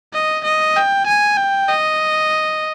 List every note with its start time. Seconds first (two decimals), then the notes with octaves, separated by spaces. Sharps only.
0.13 D#5
0.44 D#5
0.76 G5
1.07 G#5
1.37 G5
1.69 D#5